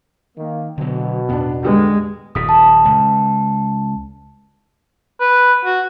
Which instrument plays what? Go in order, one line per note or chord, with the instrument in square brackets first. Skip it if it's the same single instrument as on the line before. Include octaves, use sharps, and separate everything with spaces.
[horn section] D#3 A#3
[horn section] B2 [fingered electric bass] D3 F#3
[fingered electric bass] E2 A2 [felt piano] B3 D4
[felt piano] D3 G3 B3 [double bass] G#3
[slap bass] D#1 F#2 [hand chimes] D#6 B6
[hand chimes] A5
[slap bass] C#2
[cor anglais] B4
F#4